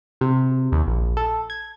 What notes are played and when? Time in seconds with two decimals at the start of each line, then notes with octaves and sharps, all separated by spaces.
0.21 C3
0.72 D#2
0.87 A#1
1.17 A4
1.50 G#6